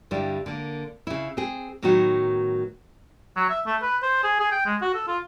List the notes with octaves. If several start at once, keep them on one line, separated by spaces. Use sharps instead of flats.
G2 D3 G3 E4
D3 A#3
C#3 E4
C4 G#4
A2 D#3 F#3 B3 D#4 F#4
F#3
E5
A3
B4
C5
G#4
G#4
G5
G#3
F#4
A4
F4